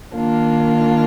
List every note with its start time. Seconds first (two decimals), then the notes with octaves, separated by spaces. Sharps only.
0.13 D#3 A#3 D4 F4